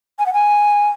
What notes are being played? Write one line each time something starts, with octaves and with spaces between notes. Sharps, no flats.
G#5
F#5
G#5